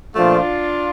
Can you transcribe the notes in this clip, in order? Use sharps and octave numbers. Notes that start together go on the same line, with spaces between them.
A#2 F3 A3 D4 F4